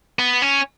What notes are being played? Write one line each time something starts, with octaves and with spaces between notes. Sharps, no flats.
B3
C#4